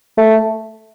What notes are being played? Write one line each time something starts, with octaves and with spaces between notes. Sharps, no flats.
A3